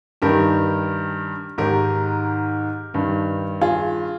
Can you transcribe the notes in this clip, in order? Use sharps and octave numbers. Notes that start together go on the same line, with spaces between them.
G2 D#3 G4 A#4
G#2 D#3 G4 A#4
G2 D#3
F4 G#4